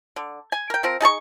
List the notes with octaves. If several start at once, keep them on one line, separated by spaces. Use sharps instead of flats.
D3
G#5
A#4 G5
F3 C4 A#4
D#4 G#4 A5 C#6